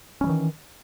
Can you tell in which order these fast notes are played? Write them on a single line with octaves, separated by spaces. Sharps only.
C#4 G3 E3 D#3